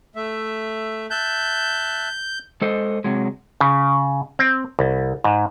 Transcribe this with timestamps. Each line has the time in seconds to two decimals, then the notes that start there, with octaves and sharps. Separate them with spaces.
0.16 A3 E5
1.11 E5 A5 F#6 G6
2.61 G#3 A4 C5 D#5
3.04 C3 F#3 G#3
3.61 C#3
4.39 C4
4.79 C2
5.24 G#2